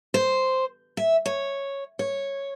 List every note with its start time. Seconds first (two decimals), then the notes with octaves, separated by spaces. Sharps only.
0.14 C5
0.97 E5
1.26 C#5
1.99 C#5